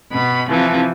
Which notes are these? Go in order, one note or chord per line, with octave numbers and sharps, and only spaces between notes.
B2 B5
C3 E3 F3